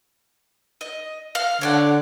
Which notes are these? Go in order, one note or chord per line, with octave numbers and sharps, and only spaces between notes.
D#5
F5 F6
D3 C#5 D5 F#5